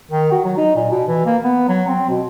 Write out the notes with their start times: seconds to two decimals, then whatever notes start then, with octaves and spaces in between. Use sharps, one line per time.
0.12 D#3
0.32 F#4
0.45 F#3
0.58 D#4
0.76 A#2
0.91 B2
1.08 E3
1.26 A#3
1.44 B3
1.68 F#3
1.87 C4
2.10 B2